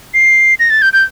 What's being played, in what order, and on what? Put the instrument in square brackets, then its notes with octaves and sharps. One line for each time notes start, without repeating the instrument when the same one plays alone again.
[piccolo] C7
A#6
A6
G6
G6